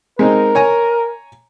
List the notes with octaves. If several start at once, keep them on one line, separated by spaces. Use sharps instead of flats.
G#3 C4 D#4 A#4
C#5 G#5 A#5